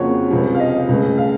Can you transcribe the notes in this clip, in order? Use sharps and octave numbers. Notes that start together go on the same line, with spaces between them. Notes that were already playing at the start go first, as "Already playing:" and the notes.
Already playing: F2 C#3 F3 A#3 F#4 C#5
C#2 C3 F3
F5
D#5
C#2 C#3 A3
F5